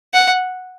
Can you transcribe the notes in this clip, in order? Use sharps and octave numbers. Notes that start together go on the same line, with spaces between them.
F#5